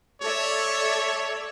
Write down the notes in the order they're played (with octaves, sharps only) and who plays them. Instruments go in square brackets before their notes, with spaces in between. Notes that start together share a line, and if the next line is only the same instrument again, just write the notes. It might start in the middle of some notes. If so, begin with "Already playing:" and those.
[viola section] A4 D5 E5 [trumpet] C#5